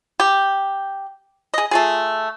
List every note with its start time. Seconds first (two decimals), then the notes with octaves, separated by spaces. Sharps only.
0.20 G4
1.54 G#4 D#5
1.71 A3 F4 G#4